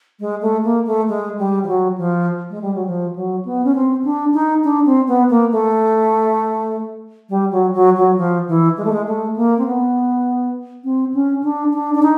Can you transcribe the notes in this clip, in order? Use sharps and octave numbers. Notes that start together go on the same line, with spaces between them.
G#3
A3
A#3
A3
G#3
G3
F3
F#3
F3
G#3
G3
F#3
F3
F#3
B3
C#4
C4
D4
D#4
D4
C4
B3
A#3
A3
G3
F#3
F#3
F#3
F3
E3
G#3
A3
G#3
A3
A#3
C4
B3
C4
C#4
D4
D4
D4
D#4